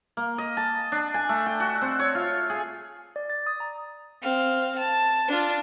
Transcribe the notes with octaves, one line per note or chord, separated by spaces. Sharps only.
A#3
D#5
A5
D4
G#5
A3
G5
F#4
C4
C#5
F4
G#4
D5
A6
D#6
A#5
C4 F5
A5
D4 F4